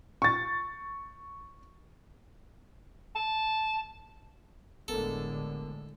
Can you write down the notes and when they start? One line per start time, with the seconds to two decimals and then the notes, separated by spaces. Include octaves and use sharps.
0.22 C#6 A6
3.16 A5
4.88 G1 A2 D3 G#3 B3 A4 A#4